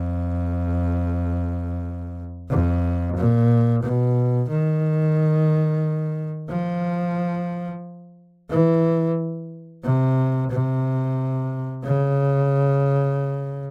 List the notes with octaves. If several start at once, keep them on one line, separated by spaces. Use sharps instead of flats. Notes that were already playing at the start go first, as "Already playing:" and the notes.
Already playing: F2
F2
A#2
B2
D#3
F3
E3
C3
C3
C#3